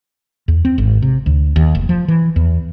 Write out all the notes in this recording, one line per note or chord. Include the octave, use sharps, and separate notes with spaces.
E2
C4
G#1
C3
D2
D#2
F1
F3
E3
E2